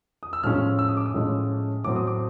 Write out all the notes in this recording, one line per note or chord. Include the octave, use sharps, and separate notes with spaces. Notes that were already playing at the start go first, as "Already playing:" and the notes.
D#6
E6
A2 F3 G#3 C#4 F6
E6
D#6
D6
D#6
A2 F3 G#3 C#4
A2 F#3 A3 C4 D6
D#6
D6